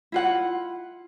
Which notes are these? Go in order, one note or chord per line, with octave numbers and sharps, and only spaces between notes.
E4 F4 F#5